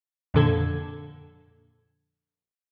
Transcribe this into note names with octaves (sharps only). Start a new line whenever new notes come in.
F2 A#2 D3 A4 G#6